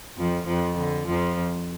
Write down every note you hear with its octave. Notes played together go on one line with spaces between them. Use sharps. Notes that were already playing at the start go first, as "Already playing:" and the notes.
F2 F3
F2 F3
D3
F2 F3